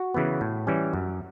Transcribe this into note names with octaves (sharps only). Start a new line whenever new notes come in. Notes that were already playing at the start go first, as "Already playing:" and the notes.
Already playing: F#4
C#3 E3 B3
A2
E3 G3 C#4
F#2